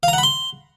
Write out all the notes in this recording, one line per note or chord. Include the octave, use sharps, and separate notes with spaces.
F5
A#5
F#5
B5
C6